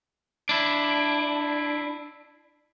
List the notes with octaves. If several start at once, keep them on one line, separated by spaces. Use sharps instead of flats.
D4 E4